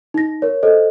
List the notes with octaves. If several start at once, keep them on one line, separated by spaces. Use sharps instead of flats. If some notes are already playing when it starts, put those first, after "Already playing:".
D#4 A#6
A#4 C#5
A4 C5 D#5